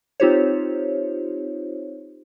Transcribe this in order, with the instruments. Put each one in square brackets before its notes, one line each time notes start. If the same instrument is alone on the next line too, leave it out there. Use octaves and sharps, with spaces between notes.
[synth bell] C4 D#4 F4 G4 C5 C#5